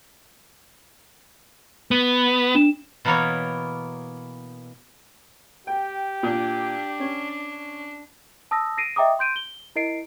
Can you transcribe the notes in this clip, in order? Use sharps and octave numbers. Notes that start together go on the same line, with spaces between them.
B3
D4 E7
B2 E3 A#3 B3 A#4 C#5
G4 G5
A#2 D4
C#4
A5 D#6 E6 A#6
A#6 C7 D7 D#7
D#5 E5 G5 A#5 D6 D#6
C6 G6 D7 D#7
G7
E4 A#4 D#5 C7 D7